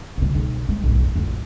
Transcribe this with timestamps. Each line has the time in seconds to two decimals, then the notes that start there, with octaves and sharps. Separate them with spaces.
0.17 C#2 C3
0.35 B1
0.69 G#3
0.84 B1 G#2
1.00 F2
1.16 A1 F2